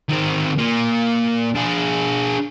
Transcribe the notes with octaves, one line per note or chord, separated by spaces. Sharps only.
D#3 C4
A#2 A#3
D4 G#4